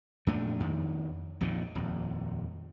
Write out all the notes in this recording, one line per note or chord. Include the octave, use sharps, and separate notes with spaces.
F2 A#2 A3 D4
F2 D#3
A#1 F2 A#2 D#3
D#1 F2